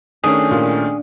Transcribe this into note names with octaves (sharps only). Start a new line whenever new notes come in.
D#3 A3 C#4 D4 G#4
A#2